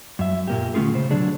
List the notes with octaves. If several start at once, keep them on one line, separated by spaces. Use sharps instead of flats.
F#2 E5
A#2 A#3 G4
D3 A3 A#3 C#4 F4 G#4
C#3 C5
B2 D3 F#3 D4 G#4